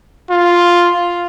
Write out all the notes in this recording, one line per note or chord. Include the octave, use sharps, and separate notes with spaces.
F4